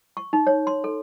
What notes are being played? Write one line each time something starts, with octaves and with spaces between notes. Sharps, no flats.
C#6
D#4
C#5
C6
A4